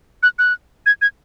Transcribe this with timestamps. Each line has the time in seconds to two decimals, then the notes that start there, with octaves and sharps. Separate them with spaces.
0.23 F#6
0.39 F#6
0.86 G#6
1.02 G#6